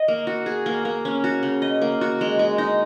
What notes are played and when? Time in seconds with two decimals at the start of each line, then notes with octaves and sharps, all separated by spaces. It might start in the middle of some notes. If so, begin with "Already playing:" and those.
Already playing: D#5
0.08 A#3
0.27 F#4
0.46 G#4
0.66 A#3
0.85 A#3
1.05 C#4
1.24 F#4
1.43 C#3
1.62 D#5
1.82 A#3
2.01 F#4
2.21 G#3
2.39 G#3
2.58 D#4